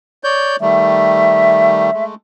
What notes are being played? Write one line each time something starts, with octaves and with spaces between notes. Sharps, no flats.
C#5 D5 G6
D#3 G3 A3 E5
G#3 A3